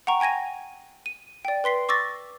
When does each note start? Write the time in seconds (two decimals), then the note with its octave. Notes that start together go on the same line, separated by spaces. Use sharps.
0.07 F#5 G5 A#5 C#6
0.20 G5 G#5 G#6 A#6 D#7
1.06 D#7
1.45 D5 G5
1.64 B4 C6 B6 C7
1.89 C#6 D6 E6 A6 A#6